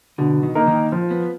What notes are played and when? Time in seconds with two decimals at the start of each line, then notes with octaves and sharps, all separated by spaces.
0.18 B2 D3
0.43 D#3
0.55 A#3 D#4 A#4
0.67 D#3
0.92 F3
1.11 B3